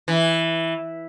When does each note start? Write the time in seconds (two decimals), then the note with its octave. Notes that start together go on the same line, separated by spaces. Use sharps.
0.08 E3